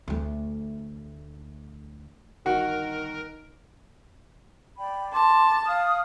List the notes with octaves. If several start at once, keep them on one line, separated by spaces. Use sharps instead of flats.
D2 A3
G1 D#3 F#4 A#4
D5 G5 B5
A5 C6 D6
F5 D#6 F6